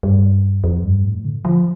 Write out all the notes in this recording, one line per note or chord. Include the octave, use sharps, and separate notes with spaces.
G2
F2
G2
A2
D3
F3